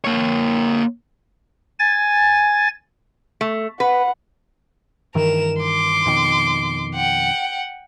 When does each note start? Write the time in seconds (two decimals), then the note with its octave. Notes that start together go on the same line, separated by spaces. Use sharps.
0.04 A#3 C#5
1.79 G#5 A6
3.41 A3
3.80 B4 F#5
5.15 G2 D#3 E3 A#4 E7
5.60 C6 D6
6.06 F2 B2 D#3
6.95 F#5 G5